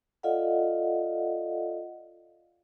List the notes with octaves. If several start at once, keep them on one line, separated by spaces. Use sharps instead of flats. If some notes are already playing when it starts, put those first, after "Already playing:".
F4 A4 D5 D#5 F5 F#5